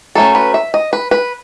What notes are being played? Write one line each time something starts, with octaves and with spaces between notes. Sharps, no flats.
F#3 A3 C#4 A4
B4
E5
D#5
B4
B4